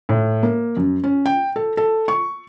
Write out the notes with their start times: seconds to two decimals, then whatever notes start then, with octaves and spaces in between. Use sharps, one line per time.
0.09 A2
0.43 A#3
0.77 F#2
1.04 C#4
1.26 G5
1.56 A4
1.77 A4
2.08 C#6